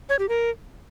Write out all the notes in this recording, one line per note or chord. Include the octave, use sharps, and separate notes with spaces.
C#5
G4
A#4